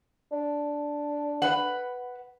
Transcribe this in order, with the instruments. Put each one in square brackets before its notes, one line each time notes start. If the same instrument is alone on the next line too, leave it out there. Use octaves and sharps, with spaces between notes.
[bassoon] D4
[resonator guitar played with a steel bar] B4 F#5